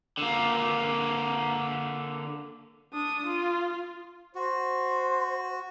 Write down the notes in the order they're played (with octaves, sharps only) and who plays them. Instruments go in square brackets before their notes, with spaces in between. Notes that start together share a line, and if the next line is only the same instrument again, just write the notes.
[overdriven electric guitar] D3 A#3
[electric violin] D4 D#6
F4
[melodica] F#4 [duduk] C5